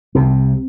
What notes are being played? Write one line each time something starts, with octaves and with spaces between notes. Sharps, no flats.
C2 C3 C4